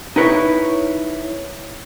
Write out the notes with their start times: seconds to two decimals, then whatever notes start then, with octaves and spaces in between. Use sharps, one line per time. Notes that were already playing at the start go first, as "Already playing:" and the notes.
0.16 D#4 E4 B4 C#5